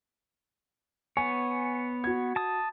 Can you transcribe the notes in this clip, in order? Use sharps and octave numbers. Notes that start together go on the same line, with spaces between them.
B3 C#5 G#5
F#4 G#6
A5 D#6